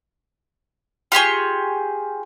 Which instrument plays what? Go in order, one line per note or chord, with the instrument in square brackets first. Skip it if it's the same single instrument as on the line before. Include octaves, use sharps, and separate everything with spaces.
[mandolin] F4 G4 G#4 C#6